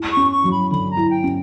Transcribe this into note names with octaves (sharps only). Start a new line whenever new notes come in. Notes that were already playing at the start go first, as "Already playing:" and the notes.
Already playing: E4
C#6
C#4
C#6
F#3
B5
D3 B5
A#5
E4
G5
C#4